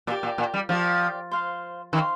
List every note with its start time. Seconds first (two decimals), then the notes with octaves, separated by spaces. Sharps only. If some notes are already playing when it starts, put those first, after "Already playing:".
0.07 A#2 G4 A#4 D5
0.23 A#2
0.38 A#2
0.54 G3
0.69 F3 G4 A#4 D5
1.31 C5 F5 C6
1.93 D#3 C5 F5 C6